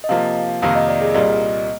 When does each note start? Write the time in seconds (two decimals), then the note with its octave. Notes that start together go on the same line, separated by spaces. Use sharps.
0.04 D#5
0.09 C3 F3 A#3 F5
0.62 F2 C3 D#3 A#3 D#4 F5
0.76 D#5
0.88 D5
1.01 G#4
1.14 C2 A#2 G3 A#3 D#5